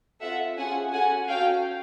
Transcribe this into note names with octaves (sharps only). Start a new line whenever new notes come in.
C4 F4 A4 E5 F#5
C#4 F4 G#4 F#5 G#5
C#4 F#4 A4 F#5 G#5
C#4 F#4 A4 F5 G5